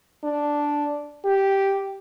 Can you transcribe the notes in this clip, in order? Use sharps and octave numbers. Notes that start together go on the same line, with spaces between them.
D4
G4